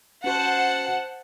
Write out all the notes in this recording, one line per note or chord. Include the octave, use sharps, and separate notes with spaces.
C#4 F#4 C5 F#5 A5